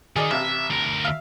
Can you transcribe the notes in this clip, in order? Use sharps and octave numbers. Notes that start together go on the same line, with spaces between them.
D#3 G#4 D5 D#5
A1 C3 E5 F5
D2 A#4
E5 F5